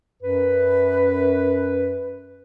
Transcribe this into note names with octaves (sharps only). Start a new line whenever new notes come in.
F#2 B4